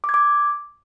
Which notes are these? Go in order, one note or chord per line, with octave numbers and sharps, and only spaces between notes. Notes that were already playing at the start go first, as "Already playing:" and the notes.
D6
G#6
D6